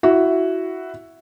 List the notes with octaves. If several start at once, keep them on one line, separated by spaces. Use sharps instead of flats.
E4 F#4